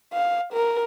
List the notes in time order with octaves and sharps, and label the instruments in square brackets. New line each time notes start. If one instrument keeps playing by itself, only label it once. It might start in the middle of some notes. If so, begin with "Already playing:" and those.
[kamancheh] F5
A#4